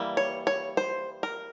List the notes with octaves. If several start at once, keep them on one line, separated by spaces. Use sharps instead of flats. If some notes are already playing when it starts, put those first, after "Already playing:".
Already playing: E3 G3 A#3
C#5
C#5
C5
A#4